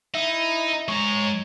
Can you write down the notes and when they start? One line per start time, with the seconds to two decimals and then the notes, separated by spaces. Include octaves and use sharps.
0.14 D#4 E4
0.88 G#3 C#5 A#5